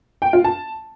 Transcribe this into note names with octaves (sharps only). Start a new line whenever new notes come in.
G5
F4
A5